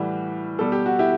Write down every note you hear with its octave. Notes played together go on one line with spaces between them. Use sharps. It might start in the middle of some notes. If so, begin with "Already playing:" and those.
Already playing: A2 E3 G3 F#4
B2 G3 A4
G4
F#4
E4 G4